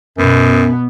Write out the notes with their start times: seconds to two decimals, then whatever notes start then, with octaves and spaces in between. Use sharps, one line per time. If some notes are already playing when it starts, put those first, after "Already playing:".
0.18 F#2 B2 B3